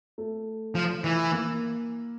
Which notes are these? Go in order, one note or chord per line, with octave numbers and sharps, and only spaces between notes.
A3
F3
E3
A#3